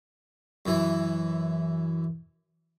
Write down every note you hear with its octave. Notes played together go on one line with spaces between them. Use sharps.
F#2 E3